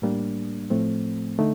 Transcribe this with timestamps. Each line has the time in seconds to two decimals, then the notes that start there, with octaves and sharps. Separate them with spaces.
0.02 A2 G3 A#3 D4
0.70 A2 F3 A3 C4
1.39 D3 A3 D#4